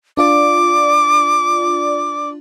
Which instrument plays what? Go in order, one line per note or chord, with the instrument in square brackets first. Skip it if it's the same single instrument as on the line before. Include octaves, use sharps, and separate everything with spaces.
[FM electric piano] D4 F4 D5 [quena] D6